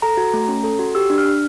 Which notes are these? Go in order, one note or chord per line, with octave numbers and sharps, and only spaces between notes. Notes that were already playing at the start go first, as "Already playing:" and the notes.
A4 A#5
F#4
A3
C#4
A4
F#4
G4 E6
D4
F6
D4